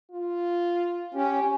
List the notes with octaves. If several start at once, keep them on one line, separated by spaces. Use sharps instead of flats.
F4
C#4 G4